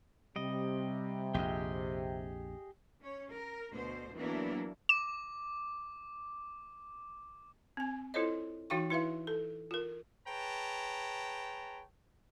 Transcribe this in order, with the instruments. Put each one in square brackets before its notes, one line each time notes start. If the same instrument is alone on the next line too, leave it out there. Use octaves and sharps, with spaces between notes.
[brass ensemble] C3 [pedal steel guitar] G3 D#5
[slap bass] A#1 F2 [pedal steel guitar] G4 G#4 D#5
[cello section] C#4 C#5
A#4
D2 B2 C5
E3 F#3 A#3 B3 D4 E4
[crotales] D6 [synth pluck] E7
[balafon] C4 G#5
E4 F4 A4 C5 C#5 D#5
E3 D#4 F#4 F5 G5 C#6
E4 B4 E5 F5
A4
F4 A#4
[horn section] G#4 B4 C#5 G5 A5 A#5